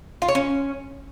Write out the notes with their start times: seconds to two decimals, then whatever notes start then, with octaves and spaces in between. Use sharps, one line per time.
0.22 F4
0.28 C#5
0.35 C#4